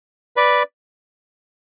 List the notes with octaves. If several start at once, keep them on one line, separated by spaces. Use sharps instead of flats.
B4 D5